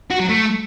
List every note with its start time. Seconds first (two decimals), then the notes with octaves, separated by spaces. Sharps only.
0.11 F#4
0.20 F#3
0.30 A3